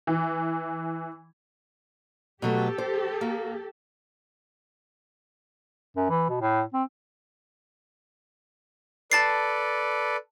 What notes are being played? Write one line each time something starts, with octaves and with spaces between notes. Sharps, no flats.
E3
B2 F#3 A3 G4 A4
C5
A#3
F#2
E3
B2
A2
C4
A4 B4 D5 A5 A6 C7